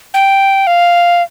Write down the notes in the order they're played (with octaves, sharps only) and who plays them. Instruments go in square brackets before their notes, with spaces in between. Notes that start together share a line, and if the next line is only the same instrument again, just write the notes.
[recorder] G5
F5